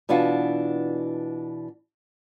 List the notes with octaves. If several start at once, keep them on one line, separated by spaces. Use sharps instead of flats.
B2 E3 D4 F4 F#4